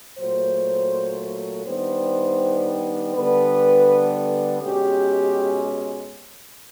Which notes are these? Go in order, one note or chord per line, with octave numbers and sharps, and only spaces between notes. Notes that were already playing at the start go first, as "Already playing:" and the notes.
A#2 F#3 A3 C5
D#3 G3 B3 D4 C5
D3 G3 B3 D4 B4
B2 G#3 C#4 G4